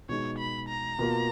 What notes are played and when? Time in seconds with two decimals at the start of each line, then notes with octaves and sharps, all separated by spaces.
0.09 B2 G#3 D#4 C#5
0.39 B5
0.69 A#5
0.99 B2 A#3 F4